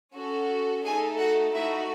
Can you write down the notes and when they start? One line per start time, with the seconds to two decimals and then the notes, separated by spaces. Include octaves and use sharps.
0.14 C#4 F#4 A4
0.84 A3 D#4 G#4 A4 G#5
1.18 F#4 F#5
1.53 A3 D#4 E4 F#4 E5